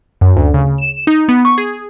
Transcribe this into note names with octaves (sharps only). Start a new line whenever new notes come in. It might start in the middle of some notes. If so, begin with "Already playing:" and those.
F#2
D2
C#3
E7
D#4
B3
C#6
G#4